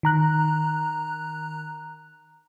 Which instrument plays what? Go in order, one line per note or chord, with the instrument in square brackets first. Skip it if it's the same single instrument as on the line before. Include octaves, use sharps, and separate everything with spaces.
[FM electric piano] D#3 A#5 F#6